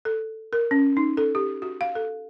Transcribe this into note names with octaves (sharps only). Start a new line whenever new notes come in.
A4
A#4
C#4
D#4
A4
G4
F#4
F5
A4